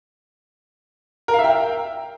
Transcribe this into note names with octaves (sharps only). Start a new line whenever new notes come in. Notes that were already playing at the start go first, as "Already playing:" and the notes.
A#4
F5
E5
G5